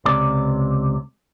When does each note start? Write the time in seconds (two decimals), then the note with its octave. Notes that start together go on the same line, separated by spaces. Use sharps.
0.05 C#2 C3 D5